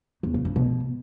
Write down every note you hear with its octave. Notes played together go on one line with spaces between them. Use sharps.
E2
C#3
G2
B2